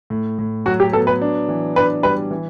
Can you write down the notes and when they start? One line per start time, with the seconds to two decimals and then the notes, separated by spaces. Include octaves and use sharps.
0.10 A2
0.39 A2
0.66 F#3 F#4
0.80 G4
0.93 B3 A4
1.07 B4
1.21 D4
1.49 E3
1.76 D4 B4
2.03 G3 B4
2.31 E3